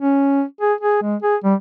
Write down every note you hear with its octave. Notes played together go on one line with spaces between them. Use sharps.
C#4
G#4
G#4
G#3
G#4
G3